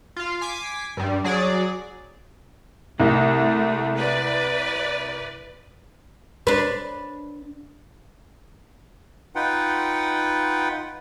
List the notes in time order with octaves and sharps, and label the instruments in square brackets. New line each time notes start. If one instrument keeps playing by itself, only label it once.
[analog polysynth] F4 F5
G#5 D6 B6 C7
G2 G3
F#3 G#4 D5
[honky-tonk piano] C2 [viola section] A3
[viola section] B4 D5
[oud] D4 B4
[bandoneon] D#4 F4 B4 F#5 G5